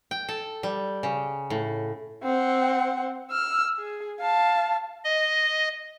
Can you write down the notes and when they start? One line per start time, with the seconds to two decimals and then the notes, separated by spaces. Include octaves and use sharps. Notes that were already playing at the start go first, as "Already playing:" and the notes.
0.11 G5
0.29 A4
0.63 G3
1.03 C#3
1.50 A2
2.23 C4 F#5
3.31 E6 F6
3.79 G#4
4.20 F5 A5
5.04 D#5